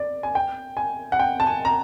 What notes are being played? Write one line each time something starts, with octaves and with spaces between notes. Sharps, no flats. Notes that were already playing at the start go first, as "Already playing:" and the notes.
Already playing: D5
G#5
G5
G#5
F#5
G5
A5
G#5
A#5